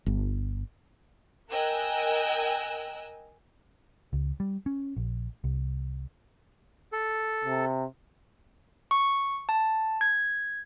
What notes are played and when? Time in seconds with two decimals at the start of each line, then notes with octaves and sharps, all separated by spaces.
0.06 G1
1.50 A#4 D#5 G5 G#5 E6 F#6
4.13 C#2
4.40 G3
4.66 C#4
4.97 A#1
5.44 C2
6.92 A4
7.45 C3
8.91 C#6
9.49 A5
10.01 G#6